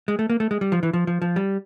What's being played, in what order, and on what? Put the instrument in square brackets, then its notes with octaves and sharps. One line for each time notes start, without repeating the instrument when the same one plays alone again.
[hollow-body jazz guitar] G#3
A3
A#3
A3
G#3
G3
F3
E3
F3
F3
F3
G3